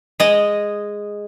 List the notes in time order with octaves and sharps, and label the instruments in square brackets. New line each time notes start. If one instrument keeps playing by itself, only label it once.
[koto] G#3 D#5